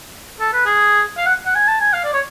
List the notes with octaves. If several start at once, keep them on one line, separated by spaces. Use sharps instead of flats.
A4
B4
G#4
F5
F#5
F#5
G#5
A5
G#5
F5
D5
C#5